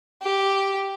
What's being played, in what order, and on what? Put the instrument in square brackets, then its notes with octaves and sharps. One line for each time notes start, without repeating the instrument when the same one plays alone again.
[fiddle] G4